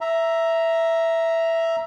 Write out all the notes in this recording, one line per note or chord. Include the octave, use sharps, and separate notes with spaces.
E5 A#5